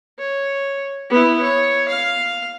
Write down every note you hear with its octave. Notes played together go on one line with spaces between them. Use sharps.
C#5
B3 E4
C#5
F5